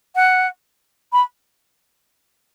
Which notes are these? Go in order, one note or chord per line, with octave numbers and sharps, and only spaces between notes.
F#5
B5